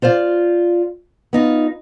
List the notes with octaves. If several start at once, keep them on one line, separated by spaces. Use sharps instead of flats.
F4 C5 D5 F5
B3 D#4 F4